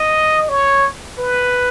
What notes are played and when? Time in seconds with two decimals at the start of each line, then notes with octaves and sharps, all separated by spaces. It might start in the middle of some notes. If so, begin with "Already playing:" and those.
Already playing: D#5
0.49 C#5
1.18 B4